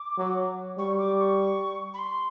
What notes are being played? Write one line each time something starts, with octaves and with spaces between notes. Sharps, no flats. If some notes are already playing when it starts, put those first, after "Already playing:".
Already playing: D6
F#3
G3 C#6
D6
C#6
B5
C6